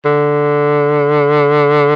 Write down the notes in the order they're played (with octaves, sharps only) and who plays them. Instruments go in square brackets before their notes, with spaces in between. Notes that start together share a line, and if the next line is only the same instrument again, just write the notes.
[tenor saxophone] D3